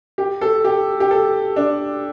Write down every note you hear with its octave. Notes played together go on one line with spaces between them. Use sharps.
G4
A4
G4
G4
A4
D4